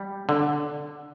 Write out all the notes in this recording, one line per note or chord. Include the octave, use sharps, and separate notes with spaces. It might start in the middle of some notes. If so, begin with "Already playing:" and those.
Already playing: G3
D3